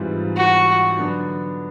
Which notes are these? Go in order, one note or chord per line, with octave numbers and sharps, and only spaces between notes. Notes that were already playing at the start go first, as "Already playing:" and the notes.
Already playing: G#2 E3 G3 C4 F4
F#4
D3 F#3 B3 D4